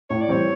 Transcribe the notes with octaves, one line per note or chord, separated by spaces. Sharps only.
A2 C#5
D5
E3 G3 C4 C#5